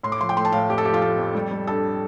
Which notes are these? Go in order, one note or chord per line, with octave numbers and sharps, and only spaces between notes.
A2 C6
D6
F3 C6
G5
A3 C6
A5
A2 F5
F2 G4
A4
F3 G4
F4
A3 A4
F2
G3
G3
G2 A4